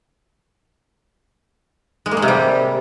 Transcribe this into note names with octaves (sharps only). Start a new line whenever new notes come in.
G#3
A#3
G#3
C3
G3